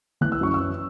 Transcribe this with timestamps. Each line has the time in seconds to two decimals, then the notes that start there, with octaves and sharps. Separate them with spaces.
0.21 E3 F#6
0.32 E6
0.41 F#2 C#6
0.54 E6
0.61 C#4